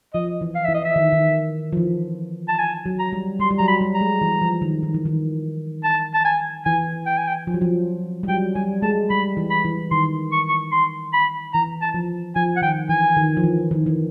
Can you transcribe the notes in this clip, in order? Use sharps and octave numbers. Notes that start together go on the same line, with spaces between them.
F3 D#5
E3
F5
E3 E5
D#5
E5
D#3
D#3
F3
E3
A5
G#5
F#3
A#5
G3
G3 C6
G3
F#3 A#5
B5
G3
A#5
G#3
E3
F3
D#3
D#3
E3
D#3
A5
A5
G#5
E3 G#5
G5
G#5
G5
F3
F#3
F3
G3
F#3 G5
G3 G#5
G#3 A5
G3 B5
E3
B5
E3
D#3 C6
C#6
C#6
C6
B5
E3 A#5
A5
F3
F3 G#5
F#5
D#3 G5
E3 G#5
D#3
F3
E3
D#3
E3